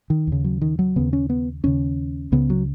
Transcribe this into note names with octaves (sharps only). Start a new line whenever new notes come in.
D#3
D#2 C#3
F#3
D#3
F#3
D#2 C#3 B3
C#4
B3
D#2 C#3 C#4
C#2 C#3 B3
F#3